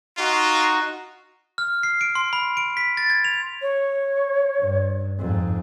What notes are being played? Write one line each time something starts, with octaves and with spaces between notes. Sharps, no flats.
D#4 F4 F#4
F6
C7
D7
C6
B5
D7
B6
A6
G#6
F7
C#5
G2
F2 G#2